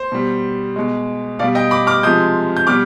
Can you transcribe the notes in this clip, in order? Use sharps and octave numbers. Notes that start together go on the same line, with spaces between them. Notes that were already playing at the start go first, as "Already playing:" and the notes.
Already playing: C5
B2 G3
B2 G#3
B2 G3 D5 F5
D#5 G5
B5 D6
D6 F6
C3 F3 G#3 D#6 G6
G6
B2 G3 D6 F6